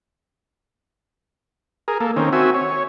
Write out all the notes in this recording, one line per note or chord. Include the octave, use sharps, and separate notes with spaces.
G#4 A#4
A#3 A4
D#3 C4 C#4
C4 F#4 E5 G#5
C#5